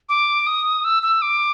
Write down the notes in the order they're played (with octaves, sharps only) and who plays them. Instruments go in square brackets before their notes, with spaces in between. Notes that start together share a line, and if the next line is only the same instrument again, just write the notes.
[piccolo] D6
D#6
E6
E6
D6